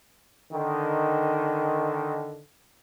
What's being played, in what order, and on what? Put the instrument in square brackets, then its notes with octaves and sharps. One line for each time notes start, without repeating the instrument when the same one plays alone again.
[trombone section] D3 D#3